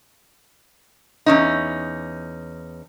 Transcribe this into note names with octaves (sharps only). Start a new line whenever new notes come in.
E2 C#4 D#4